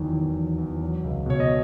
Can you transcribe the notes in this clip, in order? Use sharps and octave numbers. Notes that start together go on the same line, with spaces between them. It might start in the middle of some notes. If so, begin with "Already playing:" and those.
Already playing: E2 D#3 F#3
E2
F#3
E2
F#3
C#2
B2 C#5
D#5